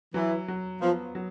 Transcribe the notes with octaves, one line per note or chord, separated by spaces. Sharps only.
E3 F#3
F#3
F3 B3
F#3